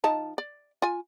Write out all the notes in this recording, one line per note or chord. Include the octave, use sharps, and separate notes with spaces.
F3 D#4 A5
D5
F4 G#5